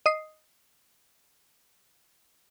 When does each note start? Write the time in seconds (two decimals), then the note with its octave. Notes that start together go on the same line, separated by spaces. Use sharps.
0.06 D#5 D#6 C7